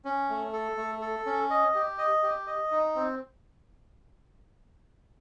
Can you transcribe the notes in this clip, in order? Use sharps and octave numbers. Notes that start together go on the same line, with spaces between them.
C#4
A3
A4
A3
A4
C#4
D#5
G4
D#5
G4
D#5
D#4
C4